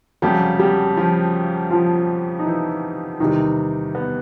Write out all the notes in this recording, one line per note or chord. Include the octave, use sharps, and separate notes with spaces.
F2 C#3 F#3 G3 G4
G3 G4
F3 F4
F3 F4
D#4
E3 E4
E2 C3 D#3 E3 G3 D#4
B3